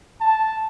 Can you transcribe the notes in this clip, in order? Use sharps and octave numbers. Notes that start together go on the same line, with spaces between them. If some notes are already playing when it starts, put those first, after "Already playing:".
A5